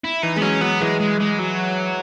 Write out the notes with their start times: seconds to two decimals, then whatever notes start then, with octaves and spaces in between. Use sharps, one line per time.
0.04 E4
0.22 E3 D#4
0.36 G#3 B3
0.42 F#3 C#4
0.61 F#3 B3
0.81 E3 G#3
1.00 G#3
1.20 G#3
1.39 F#3